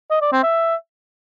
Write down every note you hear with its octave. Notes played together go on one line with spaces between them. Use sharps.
D#5
D5
C4
E5